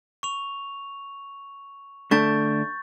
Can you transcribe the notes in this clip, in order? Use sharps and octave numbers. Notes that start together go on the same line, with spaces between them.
C#6 F7
D3 A3 D4 C#6 G6 A6